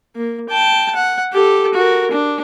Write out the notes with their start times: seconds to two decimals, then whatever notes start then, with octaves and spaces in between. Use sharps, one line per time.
0.16 A#3
0.49 G5 A5
0.95 F#5
1.33 G4 A4
1.74 F#4 A#4
2.11 D4